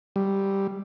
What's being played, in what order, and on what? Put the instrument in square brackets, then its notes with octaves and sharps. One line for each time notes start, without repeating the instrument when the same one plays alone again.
[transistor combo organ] G3